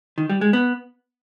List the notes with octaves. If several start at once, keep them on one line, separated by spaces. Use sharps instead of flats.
D#3
G3
G#3
B3